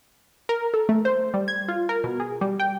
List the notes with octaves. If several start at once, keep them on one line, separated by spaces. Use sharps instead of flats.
A#4
A4
A3
C5
G3
G#6
F4
A#4
B2
G#4
G3
G5